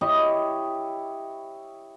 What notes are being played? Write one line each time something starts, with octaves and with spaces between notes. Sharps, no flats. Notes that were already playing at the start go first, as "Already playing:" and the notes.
E4 G4 C#5 D#5